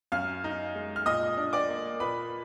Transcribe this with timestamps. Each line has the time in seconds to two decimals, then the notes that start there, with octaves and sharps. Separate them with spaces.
0.12 F#2 F5 F6
0.44 D#4
0.75 G#3
0.96 F6
1.06 A#2 D#5 D#6
1.37 D4
1.53 D5 D6
1.69 A#3
2.00 A#2 B4 B5